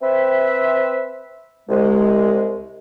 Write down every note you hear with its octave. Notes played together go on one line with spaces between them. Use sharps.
C4 B4 E5
C2 G#3